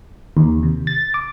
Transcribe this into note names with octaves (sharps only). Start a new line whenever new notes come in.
D#2
C3
A6
D6